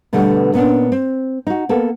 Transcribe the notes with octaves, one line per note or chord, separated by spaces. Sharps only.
B2 D3 G3 A3 B3
A#2 B3 C#4 D4
C4
D#4 F#4
A#3 B3 A4